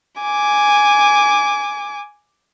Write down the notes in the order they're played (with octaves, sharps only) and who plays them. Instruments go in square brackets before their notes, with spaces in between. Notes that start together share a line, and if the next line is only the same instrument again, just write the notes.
[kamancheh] G#5 D6